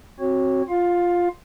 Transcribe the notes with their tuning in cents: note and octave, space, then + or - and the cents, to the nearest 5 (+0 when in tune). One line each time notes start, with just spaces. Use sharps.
C4 +20 F#4 +0 C#5 -25
F4 +0 F5 +20